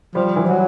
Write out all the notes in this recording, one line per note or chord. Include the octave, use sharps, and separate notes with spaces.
F3 G3 G4
E3 E4
F#3